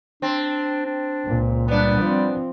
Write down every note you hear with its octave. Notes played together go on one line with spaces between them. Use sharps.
C4 D4
D4
C#2 A#2
G3 B3 D4
F3 C4